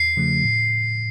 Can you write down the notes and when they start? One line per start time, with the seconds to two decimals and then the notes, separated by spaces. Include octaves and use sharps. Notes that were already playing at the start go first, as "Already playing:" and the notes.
Already playing: E2 C7
0.17 C#3 F3 A3
0.43 A2